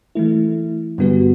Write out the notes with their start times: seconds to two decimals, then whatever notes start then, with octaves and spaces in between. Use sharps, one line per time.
0.15 E3 A3 E4
0.98 G2 D3 G3 B3 F#4